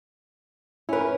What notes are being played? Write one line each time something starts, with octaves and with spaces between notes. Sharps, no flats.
C#4 E4 A#4 B4